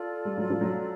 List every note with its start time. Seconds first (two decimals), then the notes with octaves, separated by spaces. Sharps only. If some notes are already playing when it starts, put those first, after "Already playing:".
Already playing: F4 A4 D5
0.25 G3
0.38 F#3
0.50 F3
0.61 F#3